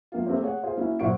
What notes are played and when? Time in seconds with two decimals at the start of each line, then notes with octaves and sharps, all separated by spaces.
0.12 F3 A#3 F4
0.27 A3 A#3 C4 G4 C5
0.42 G#4 C#5 F#5
0.63 F4 G#4 C5 F5
0.77 A#3 C#4 E4 F#4
0.99 F#2 A#2 C5 F#5 C#6 D7